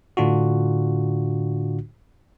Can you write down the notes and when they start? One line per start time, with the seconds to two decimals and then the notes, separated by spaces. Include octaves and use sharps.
0.17 A2 D3 D4 F4 F#4